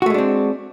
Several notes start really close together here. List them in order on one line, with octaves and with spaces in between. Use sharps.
F#4 A3 G#3 D4 C4